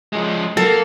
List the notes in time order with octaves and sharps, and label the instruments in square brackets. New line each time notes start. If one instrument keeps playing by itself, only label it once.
[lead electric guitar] F3 G#3
[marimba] F#3 [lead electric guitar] A#3 [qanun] A4